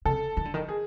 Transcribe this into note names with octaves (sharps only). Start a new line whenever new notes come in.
C3 A4
D#3
D3
D#3
G#4